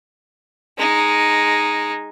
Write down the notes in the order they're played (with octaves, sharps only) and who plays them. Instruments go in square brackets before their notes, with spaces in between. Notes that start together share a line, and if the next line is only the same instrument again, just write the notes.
[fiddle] G#3 D#4